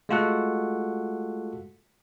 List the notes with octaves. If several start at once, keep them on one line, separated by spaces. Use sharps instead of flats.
G#3 A3 F4 F#4 A4 F#5